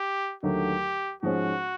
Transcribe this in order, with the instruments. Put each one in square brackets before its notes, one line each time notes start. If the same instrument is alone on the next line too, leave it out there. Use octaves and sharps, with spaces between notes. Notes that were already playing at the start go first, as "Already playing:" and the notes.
Already playing: [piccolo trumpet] G4
[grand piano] D#2 D3 F#3 A3 [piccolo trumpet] G4
[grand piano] G#2 F3 G#3 C#4 [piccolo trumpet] F#4